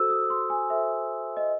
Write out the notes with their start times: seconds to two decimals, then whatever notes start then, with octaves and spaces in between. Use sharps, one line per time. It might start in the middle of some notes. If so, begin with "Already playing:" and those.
Already playing: F#4 A4 C5 E6
0.10 D#6
0.30 C6
0.50 G#5
0.70 F#4 A4 C5 E5
1.37 D#5